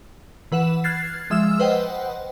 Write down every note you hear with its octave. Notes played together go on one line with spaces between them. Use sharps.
E3 B4 F#5 E7
F6 F#6 G#6 A6 C7
F3 G#3 E5 E6 F6 E7
B4 C5 D#5 F#5 G5